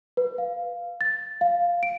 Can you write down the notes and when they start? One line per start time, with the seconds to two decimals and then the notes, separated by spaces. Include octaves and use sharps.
0.17 B4
0.38 F5
1.01 A6
1.41 F5
1.83 D7